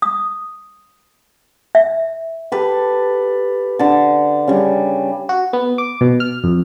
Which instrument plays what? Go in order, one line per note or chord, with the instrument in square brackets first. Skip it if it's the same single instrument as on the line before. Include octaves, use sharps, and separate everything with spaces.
[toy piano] D#6
E5
[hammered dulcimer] G4 A4 B4
D3 A5
C#3 G3
[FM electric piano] F#4
B3
D6
B2
F6
F2